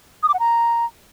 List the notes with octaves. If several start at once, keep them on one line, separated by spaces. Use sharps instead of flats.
D#6
D6
F#5
A#5